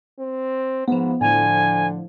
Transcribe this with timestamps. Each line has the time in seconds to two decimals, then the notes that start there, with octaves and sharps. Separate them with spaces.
0.19 C4
0.88 G#2 F3 B3
1.21 A2 D3 F3 G#5